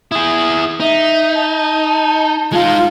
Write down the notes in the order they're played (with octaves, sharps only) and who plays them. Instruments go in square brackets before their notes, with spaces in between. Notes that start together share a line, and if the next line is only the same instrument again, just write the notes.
[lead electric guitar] E4 G#4 [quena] D#6
[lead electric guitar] D#4 [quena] E5
[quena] A5
[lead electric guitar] G#3 D#4 [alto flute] F4